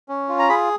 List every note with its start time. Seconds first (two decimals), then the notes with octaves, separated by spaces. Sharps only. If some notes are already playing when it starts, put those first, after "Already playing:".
0.09 C#4
0.29 F4
0.39 A#5
0.49 G#4 B5